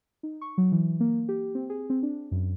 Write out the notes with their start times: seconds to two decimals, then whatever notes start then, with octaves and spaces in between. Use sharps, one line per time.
0.23 D#4
0.41 C#6
0.58 F#3
0.72 E3
1.00 A#3
1.29 G4
1.55 C4
1.70 G#4
1.90 C4
2.03 D4
2.32 F#2